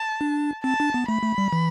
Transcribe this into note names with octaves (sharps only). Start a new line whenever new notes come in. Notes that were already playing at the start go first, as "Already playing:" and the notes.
Already playing: A5
D4
C4 A5
D4
B3
A3 B5
A3
G3
E3